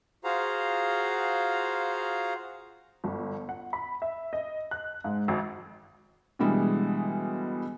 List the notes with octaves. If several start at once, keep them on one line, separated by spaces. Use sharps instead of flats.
F4 F#4 G#4 C5 F5 A#5
G1
F#5
B5
E5
D#5
F#6
G#2
G#1
B2 D3 E3 G3 G#3